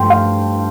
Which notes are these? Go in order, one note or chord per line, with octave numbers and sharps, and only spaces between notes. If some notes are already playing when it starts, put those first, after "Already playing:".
Already playing: G2 F3 A3 G5 C6
F5